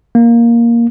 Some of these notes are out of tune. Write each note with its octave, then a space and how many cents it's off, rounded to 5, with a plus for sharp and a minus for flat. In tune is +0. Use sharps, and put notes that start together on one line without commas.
A#3 +5